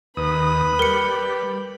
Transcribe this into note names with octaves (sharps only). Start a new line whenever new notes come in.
D#2 B4 B5 D#6
G3 A#4 C#7